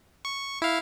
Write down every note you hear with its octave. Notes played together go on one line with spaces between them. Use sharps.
C#6
E4 F5